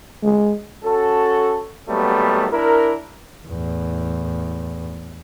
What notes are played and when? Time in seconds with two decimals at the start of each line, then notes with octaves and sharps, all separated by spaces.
0.23 G#3
0.84 C#4 F#4 A4
1.88 D#2 F#3 G3 A3 B3
2.52 D4 E4 A#4
3.48 E2 A2